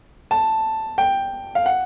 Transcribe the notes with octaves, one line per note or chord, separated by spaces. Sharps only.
A5
G5
F5
F#5